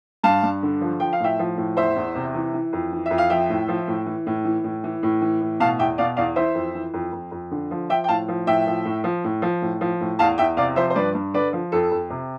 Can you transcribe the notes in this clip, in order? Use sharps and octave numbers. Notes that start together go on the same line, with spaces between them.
G2 F5 A5
G2
D3
F3
F3 G5
F5
A2 E5 G5
F3
A2
E2 C5 E5
E2
C3
E3
E3
F2
E3
F2 E5
F5
F3 E5 G5
A2
F3
A2
E3
A2
E3
A2
E3
A2
E3
A2
B2 F5 A5
E2 E5 G5
B2 D5 F5
E2 D5 F5
E3 C5 E5
F2
E3
F2
F2
F2
D3
F3
F3 E5 G5
G5
A2 F5 A5
F3
A2 E5 G5
F3
A2
F3
A2
F3
A2
F3
A2
E2 F5 A5
E2 E5 G5
C3 D5 F5
F3 C5 E5
C5
G2 B4 D5
G2
D3 B4 D5
F3
F2 A4
F2
C3